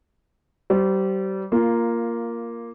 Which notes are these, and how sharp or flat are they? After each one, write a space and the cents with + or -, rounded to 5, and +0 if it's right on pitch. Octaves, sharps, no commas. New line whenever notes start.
G3 -30 C5 -25
A#3 +0 F4 -10